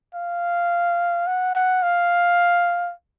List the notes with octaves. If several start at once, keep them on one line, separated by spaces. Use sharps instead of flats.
F5
F#5
F#5
F5